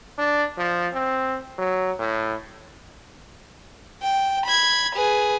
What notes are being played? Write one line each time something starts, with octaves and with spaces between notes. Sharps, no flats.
D4
F3
C4
F#3
A2
G5
B5 G#6
G#4 B4